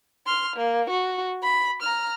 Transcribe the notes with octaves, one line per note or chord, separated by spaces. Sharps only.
C6 F6
A#3
F#4
B5
A#5 F6